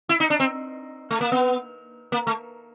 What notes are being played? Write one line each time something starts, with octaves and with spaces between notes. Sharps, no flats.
E4
D#4
D4
C4
A3
A#3
B3
A#3
A3